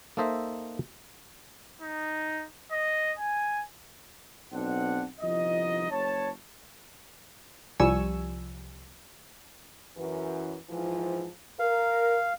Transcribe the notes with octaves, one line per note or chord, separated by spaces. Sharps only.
A#3 D#4 A4 C5 D#5 E5
D#4
D#5
G#5
B1 C4 D4 F#5
G1 C2 F3 D#4 D#5
F#1 C#5 A5
C2 F3 G3 G#5 C#6 E6
F#2 E3
G#2 E3 F3
A#4 F5